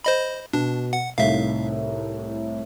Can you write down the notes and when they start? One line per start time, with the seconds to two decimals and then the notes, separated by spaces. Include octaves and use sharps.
0.04 C5 D#5 B5
0.53 B2 D4
0.93 F#5
1.18 C2 A2 D#4 E5 F5